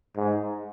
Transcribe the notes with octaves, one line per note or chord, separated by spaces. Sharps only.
G#2